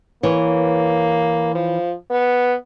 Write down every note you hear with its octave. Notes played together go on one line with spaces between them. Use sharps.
E3 A#3 C#5
F3
B3